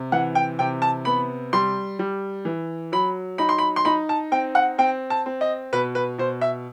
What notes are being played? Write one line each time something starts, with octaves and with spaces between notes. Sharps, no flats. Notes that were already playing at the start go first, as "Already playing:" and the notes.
Already playing: C3
E3 F#5
G5
C3 G5
A5
B3 B5
G3 C6
G3
E3
F#3 B5
D#4 B5
C6
B5
C6
D#4 B5
A5
C4 G5
F#5
C4 G5
A5
C4
D#5
B2 B4
B4
B2 C5
E5